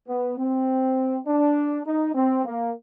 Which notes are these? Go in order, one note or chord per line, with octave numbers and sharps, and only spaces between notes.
B3
C4
D4
D#4
C4
A#3